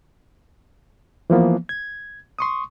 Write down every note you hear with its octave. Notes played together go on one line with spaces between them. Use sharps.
E3 F3 A#3 B3
G#6
C6 C#6 D#6